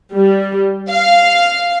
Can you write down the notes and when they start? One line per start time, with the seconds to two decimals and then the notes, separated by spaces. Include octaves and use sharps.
0.13 G3
0.89 F5